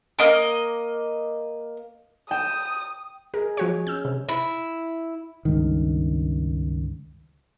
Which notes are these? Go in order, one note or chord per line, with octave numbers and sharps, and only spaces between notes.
A#3 D#5 D6
G5 D#6 E7
G#4 A#4
F3 F#4 C#5
C#4 E6 F6 G6
C3
E4
C#2 G2 D#3